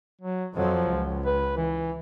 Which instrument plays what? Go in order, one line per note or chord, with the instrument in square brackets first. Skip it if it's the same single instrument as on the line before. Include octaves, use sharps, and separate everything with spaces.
[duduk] F#3
[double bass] F2 F#3 [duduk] F3
[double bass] C#2
[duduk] B4
E3